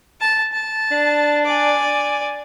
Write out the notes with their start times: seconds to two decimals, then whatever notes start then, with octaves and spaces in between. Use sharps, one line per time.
0.21 A5
0.52 A5
0.91 D4
1.45 D5 G#5